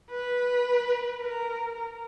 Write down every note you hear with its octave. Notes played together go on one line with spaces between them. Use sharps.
B4
A#4
A#4